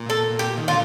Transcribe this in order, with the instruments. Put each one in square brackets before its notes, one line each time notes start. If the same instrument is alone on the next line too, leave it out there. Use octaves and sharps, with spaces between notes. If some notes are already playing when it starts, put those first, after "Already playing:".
Already playing: [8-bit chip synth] A#2
[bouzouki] A4
G4
[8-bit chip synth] D#3
[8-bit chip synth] A#2 D3 [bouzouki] F4